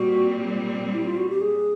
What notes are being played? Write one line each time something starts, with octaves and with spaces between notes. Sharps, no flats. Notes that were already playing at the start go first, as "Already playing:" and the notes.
Already playing: A#2 G3 C4 F#4
E4
F4
F#4
G4
G#4